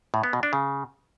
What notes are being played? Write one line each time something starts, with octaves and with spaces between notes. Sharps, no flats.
A2
B3
B2
D4
C#3